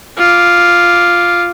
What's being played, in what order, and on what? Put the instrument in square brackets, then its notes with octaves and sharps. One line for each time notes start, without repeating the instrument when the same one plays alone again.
[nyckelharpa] F4 D6